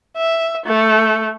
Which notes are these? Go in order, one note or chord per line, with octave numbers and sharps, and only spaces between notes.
E5
A3